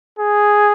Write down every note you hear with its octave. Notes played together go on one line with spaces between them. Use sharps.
G#4